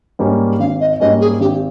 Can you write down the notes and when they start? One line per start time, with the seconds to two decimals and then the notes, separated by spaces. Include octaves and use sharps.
0.19 G#2 G3 A#3 C#4
0.59 G#1 F5
0.80 D#5
1.00 G#2 G3 A#3 C#4 D#5
1.20 G#4
1.40 G#1 G4